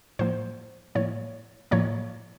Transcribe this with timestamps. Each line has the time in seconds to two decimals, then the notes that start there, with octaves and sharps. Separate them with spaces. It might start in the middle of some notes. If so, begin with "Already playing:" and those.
0.19 A2 F3 A#3 C5
0.95 A2 F3 A#3 C#5
1.71 A2 F3 A#3 C#5